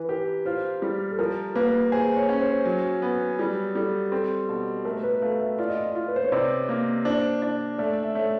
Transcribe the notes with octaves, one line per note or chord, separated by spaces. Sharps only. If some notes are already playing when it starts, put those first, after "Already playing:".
Already playing: E3 B4
G4 A#4
F4 C5
G3
A4
F3 A#4
A#3 B4
G#4 C5
C#5
C#4
C5
F#3
B3
G3
G3 A4
C4 A4
B2
A3 A#4
B4
A3 F5
E5
F4 D5
D#5
D5
F4
B4
C5
C#5
C3 D5
A#3
D4 C5
D4
A3 D5
E5
A3 C#5